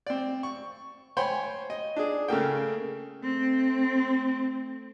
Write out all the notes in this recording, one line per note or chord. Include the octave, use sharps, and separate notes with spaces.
C4 D5
C#6
C5 C#5 G5 G#5 B5 C6
D#5
D4 G#4
C#3 A3 A#3 G5
A3 C4